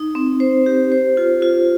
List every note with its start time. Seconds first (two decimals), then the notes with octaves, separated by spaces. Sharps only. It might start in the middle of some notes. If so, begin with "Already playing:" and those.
Already playing: D#4
0.15 C4
0.40 C5
0.66 G4
0.92 C5
1.17 F4
1.42 F4